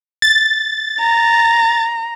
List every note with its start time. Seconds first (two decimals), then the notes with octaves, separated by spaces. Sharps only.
0.22 A6
1.01 A#5